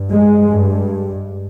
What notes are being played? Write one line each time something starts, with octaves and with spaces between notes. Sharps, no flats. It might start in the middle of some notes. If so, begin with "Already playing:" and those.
Already playing: G2
G#3
G2